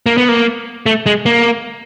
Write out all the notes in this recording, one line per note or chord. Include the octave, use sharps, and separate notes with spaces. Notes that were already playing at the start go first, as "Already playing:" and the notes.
A#3
B3
A#3
A3
G#3
A#3